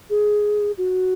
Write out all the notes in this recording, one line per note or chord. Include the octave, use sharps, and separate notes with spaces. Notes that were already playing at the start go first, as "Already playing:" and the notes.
G#4
F#4